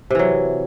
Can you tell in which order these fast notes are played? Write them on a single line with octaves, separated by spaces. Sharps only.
C3 E3 F#3